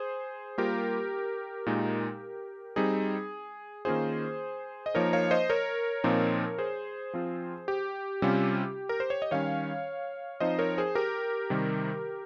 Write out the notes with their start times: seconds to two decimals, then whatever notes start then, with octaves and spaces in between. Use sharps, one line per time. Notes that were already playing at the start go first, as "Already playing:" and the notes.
Already playing: G#4 C5
0.58 G3 A#3 F4 G4 A#4
1.66 A#2 G#3 D#4
2.76 G3 C4 D#4 G#4
3.85 D#3 A#3 C#4 F4 G#4 C5
4.86 D#5
4.94 F3 A#3 D#4 A#4 C#5
5.13 C#5 F5
5.31 C5 D#5
5.50 A#4 C#5
6.04 A#2 F3 C4 D#4
6.58 G#4 C5
7.14 F3 C4 F4
7.68 G4
8.22 C3 G3 C#4 F4
8.89 A#4
9.00 C5
9.10 C#5
9.22 D#5
9.31 D#3 G3 C#4 C#5 F5
10.40 F3 C4 D#4 C5 D#5
10.59 A#4 C#5
10.78 G#4 C5
10.95 G4 A#4
11.50 C3 D#3 G3